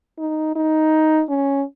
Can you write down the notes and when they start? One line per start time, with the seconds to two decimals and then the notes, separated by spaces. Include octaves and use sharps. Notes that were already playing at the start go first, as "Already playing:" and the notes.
0.18 D#4
0.55 D#4
1.29 C#4